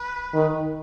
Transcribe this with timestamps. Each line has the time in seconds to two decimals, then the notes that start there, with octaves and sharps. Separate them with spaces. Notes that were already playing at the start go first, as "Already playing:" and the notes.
Already playing: B4
0.33 D#3